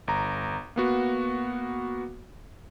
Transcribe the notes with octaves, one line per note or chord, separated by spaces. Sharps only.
G1 A#5
A#3 B3 F#4